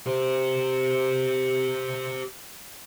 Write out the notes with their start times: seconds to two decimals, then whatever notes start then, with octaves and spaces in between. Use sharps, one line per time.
0.06 G4 C5